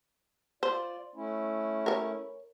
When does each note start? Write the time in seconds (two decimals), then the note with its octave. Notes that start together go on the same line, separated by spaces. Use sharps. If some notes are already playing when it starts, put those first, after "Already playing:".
0.63 F4 C5 D5
1.15 A3 C#4 E4
1.86 A#4 C#5